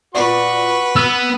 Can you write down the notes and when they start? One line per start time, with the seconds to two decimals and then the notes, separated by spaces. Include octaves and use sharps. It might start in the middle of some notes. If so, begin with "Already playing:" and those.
0.15 A#2 B3 F#4 B4 D5 C#6
0.96 B3 E6